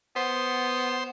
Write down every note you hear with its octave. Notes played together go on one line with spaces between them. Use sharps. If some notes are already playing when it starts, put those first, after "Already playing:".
B3 C5